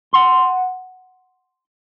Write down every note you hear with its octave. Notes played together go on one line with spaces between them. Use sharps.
F#5 C6